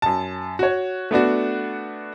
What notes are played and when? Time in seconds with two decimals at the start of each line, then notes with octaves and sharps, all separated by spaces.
0.02 F#2 A5
0.59 F#4 C#5
1.11 A3 B3 D4 F#4